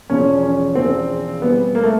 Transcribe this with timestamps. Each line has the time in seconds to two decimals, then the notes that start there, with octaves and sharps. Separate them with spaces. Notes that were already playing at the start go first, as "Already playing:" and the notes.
0.09 E1 E2 C#3 F3 C#4
0.43 C#4
0.75 E1 E2 C#3 F3 C4
1.41 B2 G3 B3 C4 E4
1.75 A#3
1.83 A3